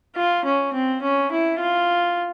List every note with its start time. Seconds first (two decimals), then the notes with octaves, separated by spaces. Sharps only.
0.16 F4
0.45 C#4
0.73 C4
1.02 C#4
1.31 E4
1.59 F4